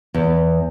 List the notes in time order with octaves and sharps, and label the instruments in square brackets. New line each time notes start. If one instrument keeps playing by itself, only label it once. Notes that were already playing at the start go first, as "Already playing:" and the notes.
[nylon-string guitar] E2